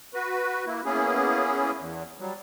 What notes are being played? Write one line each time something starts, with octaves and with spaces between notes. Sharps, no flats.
F#4 B4
A#3 E4
A#3 B3 C#4 E4 G#4
E2
F#3 G3